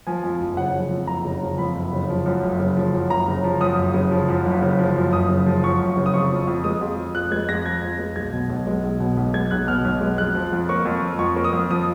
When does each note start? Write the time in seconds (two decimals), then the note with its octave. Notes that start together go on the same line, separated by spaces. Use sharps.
0.07 F3 G#5
0.24 F2
0.40 F#1
0.57 C#3 F#5
0.74 F3
0.91 F2
1.07 F#1 A#5
1.25 C#3
1.41 F3
1.58 F2 B5
1.75 F#1
1.93 C#3
2.09 F3
2.26 F#2
2.43 F#1
2.60 C#3
2.77 F3
2.93 F#2
3.10 F#1 A#5
3.28 C#3
3.44 F3
3.60 F#2 D#6
3.78 F#1
3.94 C#3
4.11 F3
4.28 F#2
4.46 F#1
4.62 C#3
4.79 F3
4.96 F#2
5.13 F#1 D#6
5.30 C#3
5.46 F3
5.63 F#2 C#6
5.81 F#1
5.97 C#3
6.06 D#6
6.14 F2 C#6
6.31 F3
6.47 F2
6.64 G#3 D#6
6.81 F2
6.98 F3
7.14 F2 F#6
7.32 G#3 G#6
7.49 F2 A#6
7.65 F3 G#6
7.82 F2
7.99 G#3
8.16 B1 G#6
8.33 B2
8.49 B1
8.67 G#3
8.83 B1
9.00 B2
9.17 B1
9.34 G#3 G#6
9.51 B1 F#6
9.67 B2 F6
9.85 B1
10.01 G#3
10.18 F2 F#6
10.35 F3
10.53 F2
10.69 A#3 C#6
10.86 F2
11.02 F3
11.19 F2 C#6
11.36 A#3
11.44 D#6
11.53 F2
11.70 F3 D#6